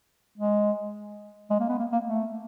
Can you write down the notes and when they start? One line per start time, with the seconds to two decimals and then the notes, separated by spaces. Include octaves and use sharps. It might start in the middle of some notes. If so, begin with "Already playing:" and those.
0.38 G#3
1.50 G#3
1.60 A#3
1.69 B3
1.79 A#3
1.92 A#3
2.07 A3